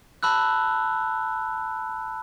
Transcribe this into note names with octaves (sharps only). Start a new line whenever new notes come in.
A5 B5 E6 F#6